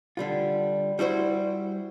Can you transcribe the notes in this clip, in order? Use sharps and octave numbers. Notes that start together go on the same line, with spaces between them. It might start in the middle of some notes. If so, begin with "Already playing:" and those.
D3 G3 F4
G3 E4 F#4 C5